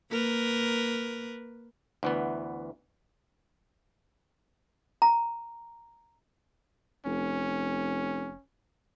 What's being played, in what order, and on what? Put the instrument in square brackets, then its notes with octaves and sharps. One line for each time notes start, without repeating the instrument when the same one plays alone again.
[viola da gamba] A#3 A#4 B4
[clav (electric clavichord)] D2 E3 B3
[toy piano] A#5
[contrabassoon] F1 [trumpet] C#4